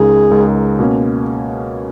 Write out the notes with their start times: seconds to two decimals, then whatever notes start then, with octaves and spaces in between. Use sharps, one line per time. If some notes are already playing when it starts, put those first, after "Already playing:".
Already playing: C#2 C#3 G#3 D#4 G#4 A#4
0.31 C#2 C#3 G#3 D#4 A#4
0.79 B2 A#3 C#4